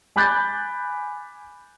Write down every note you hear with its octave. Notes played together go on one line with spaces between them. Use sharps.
G#5 B5 D6 F#6 G6 A6